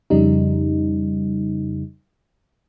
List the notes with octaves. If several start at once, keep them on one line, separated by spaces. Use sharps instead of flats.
F2 C#3 G3 D#4